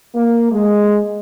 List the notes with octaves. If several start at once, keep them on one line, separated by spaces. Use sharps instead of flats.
A#3
G#3